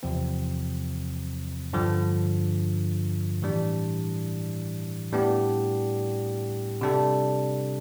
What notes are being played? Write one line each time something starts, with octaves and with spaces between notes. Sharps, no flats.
E2 C3 F3 C4
G2 D3 F3
A2 E3 G3 D4
A2 G3 B3 D4 G4
C3 G3 D4 A4